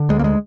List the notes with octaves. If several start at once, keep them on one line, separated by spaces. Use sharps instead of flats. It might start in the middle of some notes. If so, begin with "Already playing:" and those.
Already playing: D3
D2 G#3
A#3
G#3